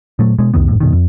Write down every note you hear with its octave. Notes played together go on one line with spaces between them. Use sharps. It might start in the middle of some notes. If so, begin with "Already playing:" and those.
A#2 F#3 A3
B2 G#3
C2 F2 D#3 B3
G#1 F2 A2
F#2 B2 D#3
F2